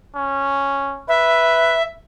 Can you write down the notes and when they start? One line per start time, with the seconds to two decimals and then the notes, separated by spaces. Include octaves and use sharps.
0.15 C#4
1.08 B4 E5